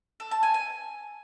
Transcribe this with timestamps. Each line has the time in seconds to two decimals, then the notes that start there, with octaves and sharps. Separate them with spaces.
0.20 A4
0.31 A5
0.43 G#5
0.54 G#5